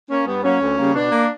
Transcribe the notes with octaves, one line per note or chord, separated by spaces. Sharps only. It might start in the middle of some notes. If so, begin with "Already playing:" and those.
A#3 C#4
G2 B3
F#3 A#3 C#4
D2
C#3 G3 A#3
B2 D4
A#3